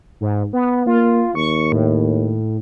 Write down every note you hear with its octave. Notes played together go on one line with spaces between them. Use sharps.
G#2
B3
A#3 F4
D#2 C#6
A2